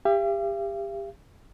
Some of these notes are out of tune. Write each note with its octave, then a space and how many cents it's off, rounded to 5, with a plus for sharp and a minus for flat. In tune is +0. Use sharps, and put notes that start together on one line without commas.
G4 +25 F5 -45